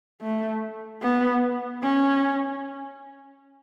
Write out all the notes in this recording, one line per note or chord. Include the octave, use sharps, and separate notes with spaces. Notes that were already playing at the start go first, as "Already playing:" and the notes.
A3
B3
C#4